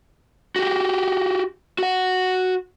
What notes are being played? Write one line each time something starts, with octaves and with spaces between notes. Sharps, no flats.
F#4 G4
F#4 F#5